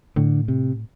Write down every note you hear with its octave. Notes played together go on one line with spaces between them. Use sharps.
A2 D3
C3